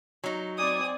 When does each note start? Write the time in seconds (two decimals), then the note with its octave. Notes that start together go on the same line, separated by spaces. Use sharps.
0.24 F#3 D#4
0.58 C4 D5 G#5 D#6